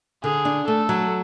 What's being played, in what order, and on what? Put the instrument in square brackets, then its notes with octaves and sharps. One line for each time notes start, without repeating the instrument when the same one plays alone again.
[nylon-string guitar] D3 [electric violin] G#4
[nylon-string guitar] D4
[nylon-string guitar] A3 [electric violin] A4
[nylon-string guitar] F#3